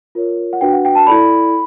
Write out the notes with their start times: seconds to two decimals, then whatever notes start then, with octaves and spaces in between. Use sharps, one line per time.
0.15 F4 A#4 C#5
0.53 F#5
0.61 D4 F#4 B4 G5
0.73 F#5
0.85 G5
0.95 A5
1.07 E4 A4 D5 B5